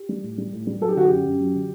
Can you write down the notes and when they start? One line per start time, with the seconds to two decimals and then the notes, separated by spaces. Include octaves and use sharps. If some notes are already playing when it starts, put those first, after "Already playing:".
Already playing: G4
0.09 G3
0.23 A2
0.38 G3
0.53 A2
0.67 G3
0.81 F#3 A4
0.89 G4
0.96 D3 F#4
1.05 G4
1.11 F#2
1.25 F#2
1.40 F#3
1.55 D3